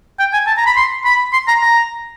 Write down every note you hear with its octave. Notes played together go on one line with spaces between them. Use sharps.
G5
G#5
A5
A#5
B5
C6
B5
C6
A#5
A#5